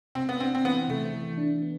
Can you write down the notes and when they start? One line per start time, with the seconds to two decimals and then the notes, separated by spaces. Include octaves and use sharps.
0.15 C3 C4
0.29 B3
0.40 C4 D4
0.55 C4
0.64 E3 B3
0.89 C3 A3
1.14 E3
1.38 D4
1.62 B3